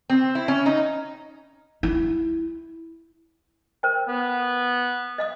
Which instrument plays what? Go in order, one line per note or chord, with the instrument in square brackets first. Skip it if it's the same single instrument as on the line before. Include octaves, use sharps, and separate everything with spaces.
[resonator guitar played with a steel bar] C4
E4
C#4
D#4
[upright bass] E4
[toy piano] A#4 C5 G5
[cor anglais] B3
[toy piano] D#5 F5 D#6